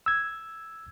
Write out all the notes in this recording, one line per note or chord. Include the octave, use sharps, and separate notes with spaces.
E6 G#6